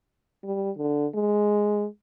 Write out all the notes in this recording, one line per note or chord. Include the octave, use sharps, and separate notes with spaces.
G3
D3
G#3